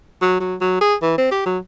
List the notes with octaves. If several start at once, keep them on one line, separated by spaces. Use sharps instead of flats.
F#3
F#3
F#3
G#4
E3
C4
G4
F#3